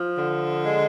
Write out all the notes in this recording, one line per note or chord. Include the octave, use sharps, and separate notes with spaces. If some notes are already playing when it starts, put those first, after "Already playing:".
Already playing: F3
D3
G#3